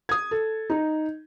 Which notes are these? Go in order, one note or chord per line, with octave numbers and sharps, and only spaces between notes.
D#6 G#6
A4
D#4